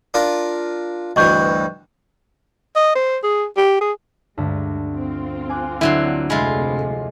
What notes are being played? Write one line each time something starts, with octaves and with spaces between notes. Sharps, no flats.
D4 F4 A#4
D2 G2 E3 D#5 C#6 G6
D#5
C5
G#4
G4
G#4
D2 G2 G3 G#3
C4 F4
G#5 D6 F#6
D3 F#3 D4 E4 C6
F2 A2 C3 G#3 F4 E5 B5